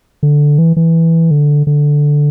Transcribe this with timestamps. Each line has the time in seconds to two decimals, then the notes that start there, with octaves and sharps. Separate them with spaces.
0.23 D3
0.58 E3
0.77 E3
1.31 D3
1.67 D3